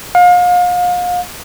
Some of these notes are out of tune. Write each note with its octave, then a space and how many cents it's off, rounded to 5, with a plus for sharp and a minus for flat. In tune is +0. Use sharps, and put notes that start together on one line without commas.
F5 +35